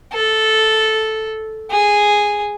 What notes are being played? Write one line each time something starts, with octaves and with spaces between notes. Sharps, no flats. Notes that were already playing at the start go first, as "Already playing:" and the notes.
A4
G#4